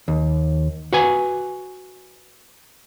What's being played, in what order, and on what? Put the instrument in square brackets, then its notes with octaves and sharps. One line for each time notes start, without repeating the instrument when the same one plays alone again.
[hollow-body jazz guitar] D#2
F#4 B4 G#5